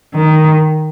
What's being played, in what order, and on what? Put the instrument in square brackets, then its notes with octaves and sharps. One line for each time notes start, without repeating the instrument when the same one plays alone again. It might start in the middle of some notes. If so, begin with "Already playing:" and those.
[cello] D#3